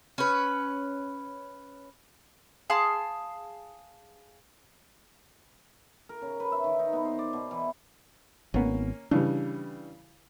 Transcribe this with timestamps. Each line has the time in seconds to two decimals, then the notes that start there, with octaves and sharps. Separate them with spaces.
0.18 C#4 B4
2.70 G#4 F5 A5 C6
6.09 A#4
6.22 C#3
6.40 B4
6.52 E5
6.64 D#3
6.79 D#4
6.93 B3
7.05 C5
7.19 D5
7.33 B2
7.51 E3
8.54 G#1 A#3 B3 C#4
9.11 C#3 E3 G3 D4